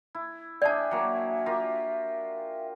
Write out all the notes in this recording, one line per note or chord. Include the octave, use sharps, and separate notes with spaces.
E4
D4 G#4 D5 E5 G5 A5
F#3 A#3
F4 G4 A#4